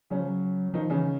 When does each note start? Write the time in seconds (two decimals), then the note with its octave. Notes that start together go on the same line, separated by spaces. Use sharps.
0.10 C#3 F#3 C#4
0.20 F3
0.27 F#3
0.74 D#3 F3 D#4
0.90 C#3 E3 C#4